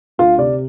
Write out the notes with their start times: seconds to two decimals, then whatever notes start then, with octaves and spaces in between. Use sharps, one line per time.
0.18 D2 F4
0.38 C3 D5